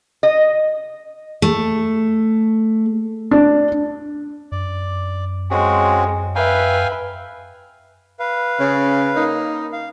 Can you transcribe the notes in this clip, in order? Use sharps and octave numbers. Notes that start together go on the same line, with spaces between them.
D#5
A3
D4
F#2 D5
G#3 C4 C#4 F#4
B4 E5 F5 G5 G#5
B4 F5
C#3
A#3 D#4
F5